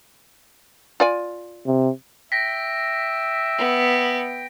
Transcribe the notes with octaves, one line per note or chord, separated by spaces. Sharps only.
F4 D5 G#5
C3
E5 G5 A#6 B6
B3